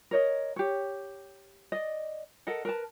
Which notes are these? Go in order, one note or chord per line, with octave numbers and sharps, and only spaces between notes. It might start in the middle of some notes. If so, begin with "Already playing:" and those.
A#4 C#5 D#5
G4 C#5
D5 D#5
A4 A#4 D#5 F#5
A#4 B4 A5